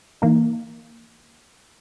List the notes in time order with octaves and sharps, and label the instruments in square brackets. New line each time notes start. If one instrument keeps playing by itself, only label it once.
[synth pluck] E3 A#3 D#4